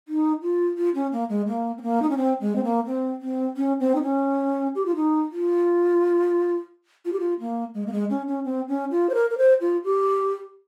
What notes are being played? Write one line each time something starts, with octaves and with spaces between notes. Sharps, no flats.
D#4
F4
F4
C#4
A#3
G#3
A#3
C4
A#3
D#4
C#4
C4
G#3
C4
A#3
C4
C4
C#4
C4
D#4
C#4
G4
F4
D#4
F4
F4
G4
F4
A#3
G#3
A#3
G#3
C#4
C#4
C4
C#4
F4
C5
A#4
A#4
C5
F4
G4